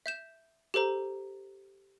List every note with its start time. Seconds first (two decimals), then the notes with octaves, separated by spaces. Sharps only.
0.06 E5 G6 E7
0.74 G4 A4 C5 A#5